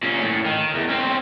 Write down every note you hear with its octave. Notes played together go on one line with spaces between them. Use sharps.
A#2 C#4
A2
D#3
E2
C4 C#4